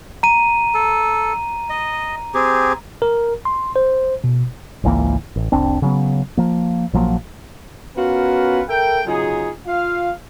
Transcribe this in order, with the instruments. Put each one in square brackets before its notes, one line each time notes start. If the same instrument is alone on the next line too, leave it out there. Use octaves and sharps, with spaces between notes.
[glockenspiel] A#5 D#7
[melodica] A4
D#5
C4 G4 G#4
[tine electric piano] A#4
C6
C5
B2
[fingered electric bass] G#1 C#2 E3 A#3
A1
F1 C2 C4 D4
C#3 F#3 B3
F3 A#3
A#1 F3 F#3 A#3
[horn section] B3 C#4 F4 F#4 A#4 B4
A4 A#4 E5 G5
C#3 F#3 D#4 F4 G#4
F4 F5